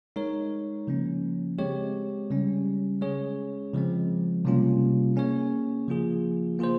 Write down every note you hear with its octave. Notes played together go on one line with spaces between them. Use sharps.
G#3 D#4 A#4 C#5
C#3 F3 A#3 C#4
G#3 C4 G4 C#5
C#3 G3 C#4
G#3 C#4 G#4 C#5
C#3 F3 G#3 C4
C3 G3 A#3 C#4 F4
A#3 C#4 G#4 C#5
C#3 F3 A#3 F4 G#4
A#3 F4 G#4 C5